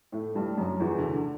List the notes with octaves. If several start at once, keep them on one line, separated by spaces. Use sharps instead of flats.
A2 A3
G2 G3
F#2 F#3
E2 E3
D3
D3